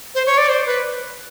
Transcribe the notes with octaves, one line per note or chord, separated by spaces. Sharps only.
C5
C#5
D5
C5
B4